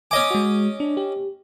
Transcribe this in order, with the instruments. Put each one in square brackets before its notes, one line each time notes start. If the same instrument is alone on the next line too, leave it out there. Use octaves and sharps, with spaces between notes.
[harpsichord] C#4 D#5 D6 [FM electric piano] G#5
[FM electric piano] G#3 F#4
D4
G4